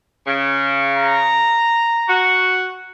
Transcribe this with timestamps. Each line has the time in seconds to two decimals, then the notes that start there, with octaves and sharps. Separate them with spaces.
0.27 C#3
0.97 A#5
2.09 F#4